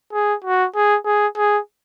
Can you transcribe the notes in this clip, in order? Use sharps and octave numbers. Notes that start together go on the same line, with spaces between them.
G#4
F#4
G#4
G#4
G#4